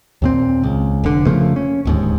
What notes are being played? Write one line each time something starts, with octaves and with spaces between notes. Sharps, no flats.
D#2 A#2 C4
C#2
F1 D3
C#3 F3 A3 A#3
C#4
D1 D#2 G#2